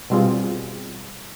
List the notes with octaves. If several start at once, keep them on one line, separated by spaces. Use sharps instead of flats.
B2 G3 C4 F4 G#4